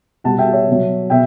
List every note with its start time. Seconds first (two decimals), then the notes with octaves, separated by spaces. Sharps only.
0.24 B2 G3 F#5 A5
0.38 E5 G5
0.53 C#5 E5
0.68 B2 F#3
1.10 B2 E5 G5